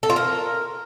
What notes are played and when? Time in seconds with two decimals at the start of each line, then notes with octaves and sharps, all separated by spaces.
0.03 A4
0.10 F4
0.16 A#4